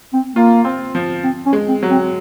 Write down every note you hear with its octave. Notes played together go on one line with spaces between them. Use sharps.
C4
A#3 F4
C4
F3
C4
C#4
G#3
C4
F#3
C4